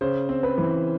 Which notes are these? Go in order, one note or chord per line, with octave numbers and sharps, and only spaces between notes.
C#3 C5
C4
B4
E3